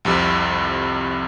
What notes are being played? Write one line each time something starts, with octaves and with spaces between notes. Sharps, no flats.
C2 F2 C3